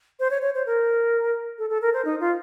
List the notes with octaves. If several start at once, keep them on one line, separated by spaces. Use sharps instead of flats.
C5
C#5
C#5
C5
A#4
A4
A4
A#4
C5
D#4
F4